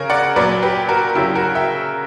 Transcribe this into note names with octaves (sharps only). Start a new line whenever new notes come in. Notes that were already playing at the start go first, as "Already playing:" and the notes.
Already playing: C#3 A#4 C#5
D5 F#5
A#2 F#3 B4 D5
G4 B4
F#4 A#4
C#3 F#3 E4 G4
F#4 A#4
E5 G5